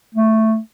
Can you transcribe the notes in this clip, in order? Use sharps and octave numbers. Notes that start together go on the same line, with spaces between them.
A3